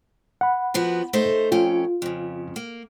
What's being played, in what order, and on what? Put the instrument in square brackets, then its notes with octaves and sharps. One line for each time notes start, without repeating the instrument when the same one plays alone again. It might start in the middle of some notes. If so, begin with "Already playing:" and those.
[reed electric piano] F#5 B5
[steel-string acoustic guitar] F3 B3 F#4
A3 D#4 C5
[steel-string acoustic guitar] F2 C#4 G5 [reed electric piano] F4
[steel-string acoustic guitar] F2 C#3
A#3